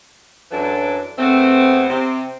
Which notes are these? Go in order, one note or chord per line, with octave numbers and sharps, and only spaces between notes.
F#2 E3 F#3 D4 A4
E2 A3 B3 C4
C3 C4